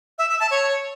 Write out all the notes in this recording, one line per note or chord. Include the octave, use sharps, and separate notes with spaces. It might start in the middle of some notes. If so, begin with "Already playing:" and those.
E5
E5
A5
C#5